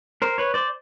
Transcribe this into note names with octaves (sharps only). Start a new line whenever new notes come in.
A#4 C5
B4 C#5
C5 D5